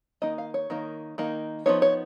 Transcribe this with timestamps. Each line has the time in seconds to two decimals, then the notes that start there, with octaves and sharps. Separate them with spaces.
0.22 D#3 A#3 D#4 D#5
0.38 F5
0.54 C#5
0.70 D#3 A#3 D#4
1.18 D#3 A#3 D#4
1.66 F3 B3 D#4 C#5
1.82 C#5